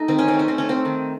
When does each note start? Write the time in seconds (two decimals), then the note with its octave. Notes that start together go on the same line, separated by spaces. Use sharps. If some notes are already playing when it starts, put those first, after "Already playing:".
Already playing: A3 D#4
0.08 D#3 C4
0.18 C#4
0.28 C4
0.34 A3
0.39 C#4
0.48 C4
0.58 A3 C#4
0.69 C4
0.85 D#3